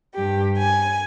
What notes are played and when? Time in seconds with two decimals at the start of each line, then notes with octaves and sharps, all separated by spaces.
0.14 G2 G4
0.57 G#5